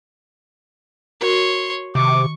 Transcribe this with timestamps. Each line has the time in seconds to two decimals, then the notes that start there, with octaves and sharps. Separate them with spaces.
1.21 F#4 A#4 C#5 C6
1.95 C3 D#3 C#6 D6